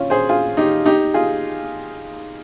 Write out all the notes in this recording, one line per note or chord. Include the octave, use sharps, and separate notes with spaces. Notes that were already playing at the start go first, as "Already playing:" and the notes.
Already playing: C#4 F4
G#4 C5
F4 G#4
D#4 G4
D#4 G4
F4 G#4